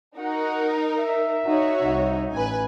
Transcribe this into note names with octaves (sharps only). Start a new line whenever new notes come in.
D#4 F#4 A#4 F#5
E5
D#4 F#4 C#5
C2 D#4
A1 B4 G#5